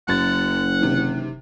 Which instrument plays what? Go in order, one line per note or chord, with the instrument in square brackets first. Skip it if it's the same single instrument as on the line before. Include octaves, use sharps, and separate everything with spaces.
[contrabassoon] F#1 [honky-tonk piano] F#2 A6 [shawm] F#5
[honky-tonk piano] C3 D#3 E3